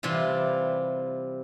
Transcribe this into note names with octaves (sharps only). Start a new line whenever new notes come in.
C3 E3 G3 F4